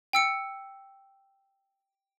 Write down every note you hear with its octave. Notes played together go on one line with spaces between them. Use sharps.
G5 E6 C#7